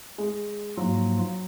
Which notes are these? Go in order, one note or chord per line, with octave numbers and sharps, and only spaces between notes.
G#3
G#2 F3 F#3 A#3 F4